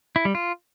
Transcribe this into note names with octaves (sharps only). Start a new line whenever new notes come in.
E4
G3
F4